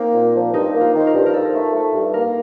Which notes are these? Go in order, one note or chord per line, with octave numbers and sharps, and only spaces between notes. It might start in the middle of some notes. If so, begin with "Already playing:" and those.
Already playing: A#3 C4 D#4
A#2
F3
G2 D#4
A#3
F4
D#3
C5
A#4
G2
A#4
F3 A4
A3
A3
G2
A#3 A#4